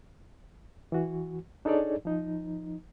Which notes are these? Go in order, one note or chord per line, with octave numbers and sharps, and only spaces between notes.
E3 F#4
D4 D#4 G#4 A4 C#5 D5
F3 D#4